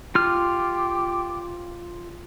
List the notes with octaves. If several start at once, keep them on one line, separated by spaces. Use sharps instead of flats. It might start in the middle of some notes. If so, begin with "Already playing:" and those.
F4 G4 F6